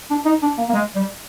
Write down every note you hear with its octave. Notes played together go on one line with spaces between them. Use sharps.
D4
D#4
D4
A#3
A#3
G#3
G3